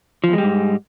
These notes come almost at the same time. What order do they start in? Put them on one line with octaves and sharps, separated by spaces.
F3 E2 G#3 G3 G#2